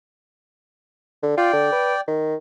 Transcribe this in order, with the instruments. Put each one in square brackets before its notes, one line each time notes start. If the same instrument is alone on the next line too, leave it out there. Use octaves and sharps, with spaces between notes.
[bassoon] D3
[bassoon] F4 [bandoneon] D5 G5
[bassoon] D3
B4
D#3